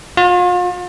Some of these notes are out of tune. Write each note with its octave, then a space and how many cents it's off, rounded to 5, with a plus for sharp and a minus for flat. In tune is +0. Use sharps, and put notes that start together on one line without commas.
F4 +40